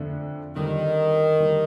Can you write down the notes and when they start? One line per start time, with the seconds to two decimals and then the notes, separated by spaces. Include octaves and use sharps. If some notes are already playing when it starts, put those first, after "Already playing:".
Already playing: F2 D3 A3 D4
0.56 F2 D3 D#3 G3
1.40 D3 G3